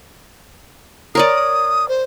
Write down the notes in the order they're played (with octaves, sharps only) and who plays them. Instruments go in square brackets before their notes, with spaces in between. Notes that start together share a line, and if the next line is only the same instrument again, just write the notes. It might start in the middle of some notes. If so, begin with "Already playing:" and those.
[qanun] A#4 C#5 D5 [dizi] D#6
[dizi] C5